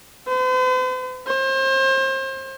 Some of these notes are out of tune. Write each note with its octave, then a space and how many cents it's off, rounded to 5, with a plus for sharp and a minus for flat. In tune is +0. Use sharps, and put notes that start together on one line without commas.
C5 -45
C5 +30